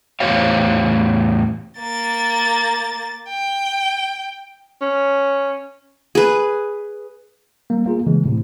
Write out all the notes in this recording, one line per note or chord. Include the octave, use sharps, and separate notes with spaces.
E2 A2 G4 C5 C#5 F5
A#3 A6
G5
C#4
G#4 B4
G3 A#3
A#3 F4 G#4
C#3 E3 G#3
A2 C3